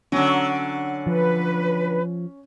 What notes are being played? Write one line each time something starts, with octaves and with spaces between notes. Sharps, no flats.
D3 F#3 C#4
F3 B4